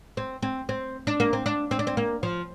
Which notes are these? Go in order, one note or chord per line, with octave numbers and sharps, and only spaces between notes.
C4
C4
C4
D4
A#3
C4
D4
C4
D4
C4
A#3
F3